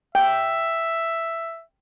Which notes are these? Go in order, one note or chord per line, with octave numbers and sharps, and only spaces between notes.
E5 G5